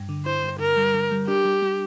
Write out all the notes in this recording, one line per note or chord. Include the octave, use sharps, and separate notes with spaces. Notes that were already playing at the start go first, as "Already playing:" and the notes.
Already playing: G2
D3
E4 C5
G2
D3 A#4
G3
D3
G3
D4 G4
G3
G3